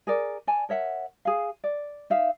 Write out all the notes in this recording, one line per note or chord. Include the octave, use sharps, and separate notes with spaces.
G#4 A#4 D5
D5 G#5 A5
A#4 C#5 E5 F#5
G#4 F5
D5
D#4 E5 F5